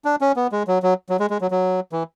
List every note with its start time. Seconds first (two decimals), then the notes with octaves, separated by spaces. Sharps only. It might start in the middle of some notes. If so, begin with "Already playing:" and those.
0.05 D4
0.21 C#4
0.36 B3
0.52 G#3
0.68 F#3
0.83 F#3
1.09 F#3
1.20 G#3
1.30 G#3
1.41 F#3
1.51 F#3
1.92 E3